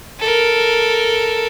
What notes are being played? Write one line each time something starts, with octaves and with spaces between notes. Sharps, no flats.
A4 A#4